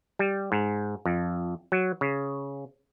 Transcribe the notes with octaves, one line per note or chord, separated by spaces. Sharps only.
G3
G#2
F2
F#3
C#3